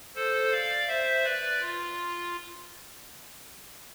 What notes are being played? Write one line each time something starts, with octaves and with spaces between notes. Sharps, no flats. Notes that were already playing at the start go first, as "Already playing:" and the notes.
A4 C5
D5 F5
C5 E5
B4 D5
F4